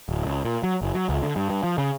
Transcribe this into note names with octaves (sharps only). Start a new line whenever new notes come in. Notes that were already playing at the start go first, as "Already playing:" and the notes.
D1
C#2
A#2
F#3
F#1
F#3
C#2
D3
G2
G2
F3
C#3